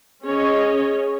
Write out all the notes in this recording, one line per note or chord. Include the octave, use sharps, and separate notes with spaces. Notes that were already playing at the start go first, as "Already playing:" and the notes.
C#4 G#4 C#5 D#5